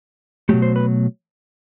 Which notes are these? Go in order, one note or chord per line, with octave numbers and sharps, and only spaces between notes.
B2 F#3 A3 G4
C5
B4